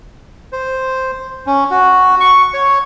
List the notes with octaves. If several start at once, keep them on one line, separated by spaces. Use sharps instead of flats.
C5
C#4
F#4
C#6
C#5